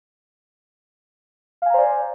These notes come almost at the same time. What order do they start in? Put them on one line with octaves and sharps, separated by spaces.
F5 G#5 A#5 C5 D5